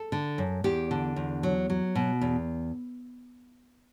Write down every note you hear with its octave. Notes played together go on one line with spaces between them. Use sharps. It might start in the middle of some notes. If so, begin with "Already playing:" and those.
Already playing: A4
D3
F#2
E2 G4
D3
E2
F#3
F#3
B2
E2